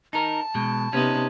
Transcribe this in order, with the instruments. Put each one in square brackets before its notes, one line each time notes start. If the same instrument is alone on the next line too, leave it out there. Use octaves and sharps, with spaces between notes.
[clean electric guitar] D#4 A#4 [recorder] A5
[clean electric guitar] B2 G#3
[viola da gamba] C3 B3 [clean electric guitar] C#4 D#4